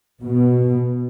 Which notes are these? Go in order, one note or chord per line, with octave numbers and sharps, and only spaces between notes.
B2